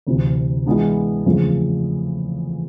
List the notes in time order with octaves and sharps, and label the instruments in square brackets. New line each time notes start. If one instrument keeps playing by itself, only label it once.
[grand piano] D2 C3 E3
E3 G#3 B3 D4
E2 C#3 F3 A3 C4